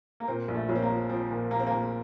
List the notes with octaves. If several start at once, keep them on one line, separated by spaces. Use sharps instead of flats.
A#3
A#2 C4
A#1
A3
A#1 C#4
C4
A#3
F3
F3 C4
A#2
A#2 A#3
C4
A#2 A#3